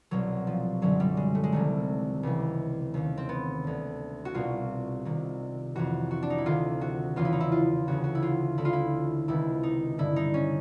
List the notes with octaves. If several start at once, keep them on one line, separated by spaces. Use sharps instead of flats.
C2 B2 F#3
F3
F#2 D3 F#3
G3
G#3
A3
G#3
C2 C3 D#3 A3
C#2 C3 E3
D#2 D#3
C4
B3
D2 D3
F#4
C2 B2 F4
C2 C3 D#3
F2 C3 E3 F#4
F#4
D4
D#4
E4
D2 C3 D#3 F4
F#4
E2 C#3 E3 F4
E4
D#4
E4
F4
D2 C#3 E3 F#4
F#4
E4
F4
D2 D3 E4
F4
E4
C#2 C3 D#3 E4
D#4
G2 D3 E4
D#4
C#4